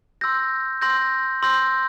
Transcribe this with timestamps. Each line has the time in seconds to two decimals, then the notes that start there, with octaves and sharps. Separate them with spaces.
0.21 C6 E6 G6 A#6
0.81 C6 E6 G6 A#6
1.42 C6 E6 G6 A#6